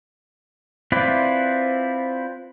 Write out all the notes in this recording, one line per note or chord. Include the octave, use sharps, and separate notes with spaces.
C4 E4 F4 B4 D5